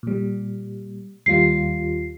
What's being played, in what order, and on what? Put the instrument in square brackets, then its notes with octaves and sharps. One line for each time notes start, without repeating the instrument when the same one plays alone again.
[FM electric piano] A#2 G3
[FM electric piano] D#2 G3 F4 [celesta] C7